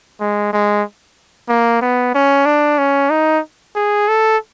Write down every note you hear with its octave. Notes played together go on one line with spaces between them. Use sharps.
G#3
G#3
A#3
B3
C#4
D4
C#4
D#4
G#4
A4